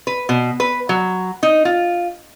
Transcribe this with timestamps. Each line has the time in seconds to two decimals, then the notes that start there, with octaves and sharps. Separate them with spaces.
0.07 B4
0.29 B2
0.60 B4
0.89 F#3
1.43 D#4
1.65 F4